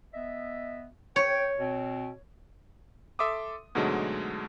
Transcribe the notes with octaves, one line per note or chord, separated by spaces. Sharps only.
B3 D#5 E5
C#5 G5
B2 C4
A4 E5 C6 D6 D#6
G#2 B2 D3 F#3 G#3 A3